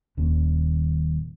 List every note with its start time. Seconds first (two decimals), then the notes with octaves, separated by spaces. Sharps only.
0.17 D#1 D#2 C#4